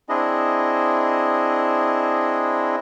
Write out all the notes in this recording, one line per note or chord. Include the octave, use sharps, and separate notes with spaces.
C4 D4 E4 G#4 D#5